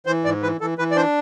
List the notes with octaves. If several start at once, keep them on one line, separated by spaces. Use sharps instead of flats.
E3 C5
G#2 D5
E3 B4
E3 A4
E3 B4
D5
D4 C5